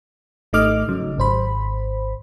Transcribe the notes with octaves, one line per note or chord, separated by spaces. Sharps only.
G#1 A3 D#4 D#5 D6 F6
C#3 F#3
G#1 C5 B5